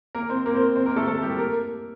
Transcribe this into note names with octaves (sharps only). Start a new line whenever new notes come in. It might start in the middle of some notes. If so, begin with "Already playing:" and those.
A#3 A#4
C4 C5
A#3 A#4
C4 C5
C4 C5
A#3 A#4
A3 A4
A3 A4
G3 G4
A#3 A#4